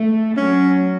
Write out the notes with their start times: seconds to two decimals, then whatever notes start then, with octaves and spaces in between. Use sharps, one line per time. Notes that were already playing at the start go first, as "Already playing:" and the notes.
Already playing: A3
0.36 F#3 C#4